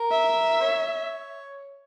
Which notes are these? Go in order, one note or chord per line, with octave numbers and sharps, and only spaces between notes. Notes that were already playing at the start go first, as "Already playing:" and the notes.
Already playing: A#4
E5
C#5